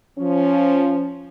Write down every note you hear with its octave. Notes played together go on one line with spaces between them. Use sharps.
F3 C#4